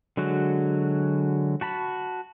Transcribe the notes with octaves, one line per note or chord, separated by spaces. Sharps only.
D3 F#3 G#3 F#4
F#4 A5 B5